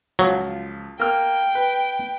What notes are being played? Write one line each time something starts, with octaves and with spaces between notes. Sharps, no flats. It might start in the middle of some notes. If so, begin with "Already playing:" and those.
C#2 F3 F#3
A#3 G5 F6
B4